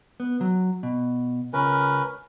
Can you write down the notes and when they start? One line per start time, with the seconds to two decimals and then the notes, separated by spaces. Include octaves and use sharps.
0.20 B3
0.41 F#3
0.83 B2
1.53 C#2 C#4 A#4 B4